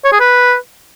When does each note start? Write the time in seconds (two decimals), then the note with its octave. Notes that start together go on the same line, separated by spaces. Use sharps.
0.05 C#5
0.12 G#4
0.20 B4